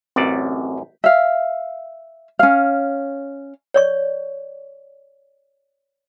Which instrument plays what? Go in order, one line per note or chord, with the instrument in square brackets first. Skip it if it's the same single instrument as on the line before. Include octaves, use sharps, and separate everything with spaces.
[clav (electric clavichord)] A1 F#2 D5 [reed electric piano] C4
[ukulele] E5 F5
C#4 F5
[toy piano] C#5 D5 C#6